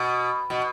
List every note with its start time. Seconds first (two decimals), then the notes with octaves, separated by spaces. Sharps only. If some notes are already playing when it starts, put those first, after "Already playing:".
Already playing: B2
0.50 B2